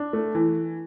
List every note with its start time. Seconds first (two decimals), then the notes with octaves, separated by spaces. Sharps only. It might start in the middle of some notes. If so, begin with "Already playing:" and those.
Already playing: D4
0.13 A3
0.35 E3